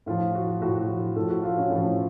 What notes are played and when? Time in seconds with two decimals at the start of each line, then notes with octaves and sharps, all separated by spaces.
0.06 A2 F3 F4
0.35 F#4
0.61 A2 F3 F#4
1.16 A2 F3 A4
1.30 F#4
1.44 F4
1.58 C#4
1.70 A2 F3